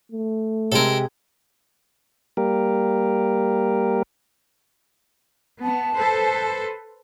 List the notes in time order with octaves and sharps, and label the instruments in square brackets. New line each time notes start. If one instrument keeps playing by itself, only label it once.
[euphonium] A3
[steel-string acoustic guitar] C3 G#3 [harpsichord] A4 A#4
[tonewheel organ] G3 A#3 G4 A#4
[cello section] B3 [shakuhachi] A5
[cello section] A4 B4 C5